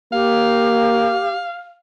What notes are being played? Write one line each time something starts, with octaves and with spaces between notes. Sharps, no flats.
A#3 G4 F5